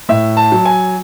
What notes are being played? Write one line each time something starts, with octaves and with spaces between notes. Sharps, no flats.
A2 E5
A5
F#3
G#5